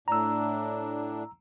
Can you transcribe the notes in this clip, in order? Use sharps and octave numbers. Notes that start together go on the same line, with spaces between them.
A2 D4 A#5 E6